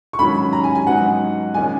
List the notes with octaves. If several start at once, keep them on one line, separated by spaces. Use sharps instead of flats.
C#6
G#2 D#3 F#3 C#4 B5
A#5
G#5
G#5
G#2 F#3 B3 D#4 F#5
A#1 D#3 G#3 C#4 G#5